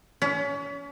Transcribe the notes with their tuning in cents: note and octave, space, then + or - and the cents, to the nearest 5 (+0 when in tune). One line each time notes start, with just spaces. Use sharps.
C#4 +35